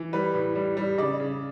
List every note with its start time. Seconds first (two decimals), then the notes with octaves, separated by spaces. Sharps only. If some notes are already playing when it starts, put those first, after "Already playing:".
Already playing: E3
0.13 G3 B4
0.34 A2
0.55 G3
0.77 G3
0.98 C#3 D5
1.20 C#3